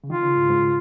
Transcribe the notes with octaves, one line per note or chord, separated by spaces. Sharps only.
C#3
D#3 F4
C#3
G#2
G#2